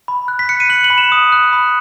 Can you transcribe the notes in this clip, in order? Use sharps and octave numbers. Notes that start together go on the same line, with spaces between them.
B5
F#6
B6
F#6 C#7
D#7
F#6 F#7
F#7
B5
E7
D#6
F#6
B5